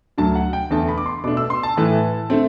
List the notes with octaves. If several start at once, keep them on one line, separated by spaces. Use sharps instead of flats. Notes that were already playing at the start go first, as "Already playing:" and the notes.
D2 D3 F#3 A5
F#5
G5
E2 D3 A3 A5
B5
D6
C6
B2 A3 D4 D6
E6
C6
A5
A2 E3 A3
D3 A3 C4